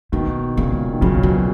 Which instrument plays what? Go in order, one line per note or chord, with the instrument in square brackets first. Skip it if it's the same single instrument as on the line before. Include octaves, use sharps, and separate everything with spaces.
[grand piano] B2 D#3 [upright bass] A#3
[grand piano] A#2 C#3 [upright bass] G#3
[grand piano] D#3
[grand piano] A#2 C#3 [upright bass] F#3
[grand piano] B2 [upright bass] F#3